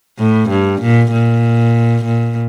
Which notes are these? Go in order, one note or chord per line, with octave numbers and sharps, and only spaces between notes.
A2
G2
A#2
A#2
A#2